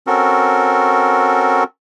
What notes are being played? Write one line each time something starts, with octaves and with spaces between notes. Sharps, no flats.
C4 C#4 F#4 A4 A#4